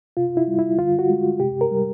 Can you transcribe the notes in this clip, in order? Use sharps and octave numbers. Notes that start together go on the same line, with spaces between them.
C3 F4
E4
G3
E4
D3 F4
F#4
G#3
C3 G4
A#4
G3